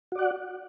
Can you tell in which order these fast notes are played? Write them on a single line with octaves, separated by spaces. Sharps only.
F#4 D5 F#5